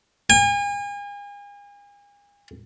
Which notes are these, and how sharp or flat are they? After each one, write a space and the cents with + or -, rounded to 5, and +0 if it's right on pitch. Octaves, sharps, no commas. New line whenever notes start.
G#5 -40